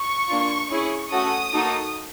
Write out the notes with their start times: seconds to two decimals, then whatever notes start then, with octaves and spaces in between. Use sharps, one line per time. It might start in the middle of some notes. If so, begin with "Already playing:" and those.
Already playing: C#6
0.29 A#3 D4 F4
0.70 C#4 E4 G#4
1.12 A3 C#4 F#4 A4 D#6
1.54 A#3 D#4 F#4 A4